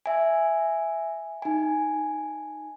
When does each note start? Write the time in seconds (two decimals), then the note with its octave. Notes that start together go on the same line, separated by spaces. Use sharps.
0.06 E5 G#5
1.42 D#4 G#5